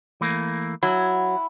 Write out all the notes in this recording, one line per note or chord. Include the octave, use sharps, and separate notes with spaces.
E3 A3 A#3
F#3 E4